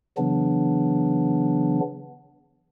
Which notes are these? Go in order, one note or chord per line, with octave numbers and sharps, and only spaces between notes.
C#3 E3 F#3 B3 D4